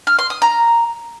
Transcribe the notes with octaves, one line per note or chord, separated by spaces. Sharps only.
F6
C6
D#6
A#5